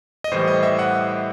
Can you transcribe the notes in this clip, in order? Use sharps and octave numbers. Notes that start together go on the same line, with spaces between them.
D#5
A2 E3 G3 C5
D#5
E5
F#5
E5